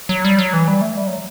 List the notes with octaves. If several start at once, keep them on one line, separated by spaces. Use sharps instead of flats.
F#3
G3
F#3
E3
G3
A3
G3
F#3